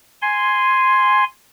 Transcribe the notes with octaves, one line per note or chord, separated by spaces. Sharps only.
G#5 C6